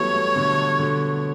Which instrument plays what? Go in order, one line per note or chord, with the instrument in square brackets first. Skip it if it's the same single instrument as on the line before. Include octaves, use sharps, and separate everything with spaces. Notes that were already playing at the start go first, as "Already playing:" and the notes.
Already playing: [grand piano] E3 F#3 G3 A3 B3 [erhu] C#5
[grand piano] F#3 A3
B2 D3
B2 D3